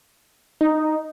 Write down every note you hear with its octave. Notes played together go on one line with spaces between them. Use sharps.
D#4